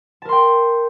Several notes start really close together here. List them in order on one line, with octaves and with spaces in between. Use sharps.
A5 A#4 C6 G5